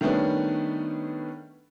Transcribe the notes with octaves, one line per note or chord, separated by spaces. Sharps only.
D#3 G3 A3 B3 C#4 D4